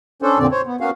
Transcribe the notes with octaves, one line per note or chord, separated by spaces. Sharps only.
C#4 D4 A4 C5
F2 A#2 D3 C4 D5
C5 C#5
B3
A#3 B3 C#4 F#4 F5